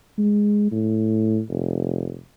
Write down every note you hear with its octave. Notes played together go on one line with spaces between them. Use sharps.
G#3
A2
F1